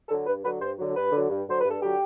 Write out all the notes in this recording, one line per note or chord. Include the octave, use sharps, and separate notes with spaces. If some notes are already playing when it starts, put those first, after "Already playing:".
D3 A4
F#3
G2 B4
D3 F#3 B4
G2 C5
D3 F#3
G2 B4
D3
F#3
G2
D3 F#3 C5
G2 B4
A4
D3 F#3 G4